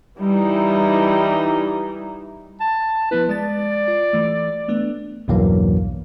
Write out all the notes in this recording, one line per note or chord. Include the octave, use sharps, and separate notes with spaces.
E3 G3 D#4 E4
A5
F3 B3 E4 B4
G#3 D5 A5 A6
F4
E3 A3
A3 B3 D4
B1 E2 G2 E3 F#3 A#3